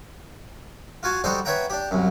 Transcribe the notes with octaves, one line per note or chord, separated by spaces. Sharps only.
F4 F#4 G#5 A5
G3 D4 D#4 F#4 A4 C5
B4 C#5 E5 F#5 G5 A#5
D4 G4
C2 F#2